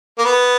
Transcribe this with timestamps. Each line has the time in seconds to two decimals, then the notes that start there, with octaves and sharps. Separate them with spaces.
0.18 A#3
0.25 B3